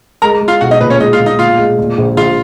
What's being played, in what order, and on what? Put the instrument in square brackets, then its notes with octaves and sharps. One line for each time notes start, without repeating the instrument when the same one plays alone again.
[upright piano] G#3 [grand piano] A#4 A#5
[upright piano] G#3
[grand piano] F4 F5
[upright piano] B1 [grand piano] F#4 F#5
[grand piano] D#4 D#5
[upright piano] A#2 [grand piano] B4
[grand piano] C#4 C#5
[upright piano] G#3 [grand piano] D#4 D#5
[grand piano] F4 F5
[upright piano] A#2
[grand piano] D#4 D#5
[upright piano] A#2 [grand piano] F4 F5
[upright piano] G#3
A#2
A#1
[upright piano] A#1 [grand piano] F4 F5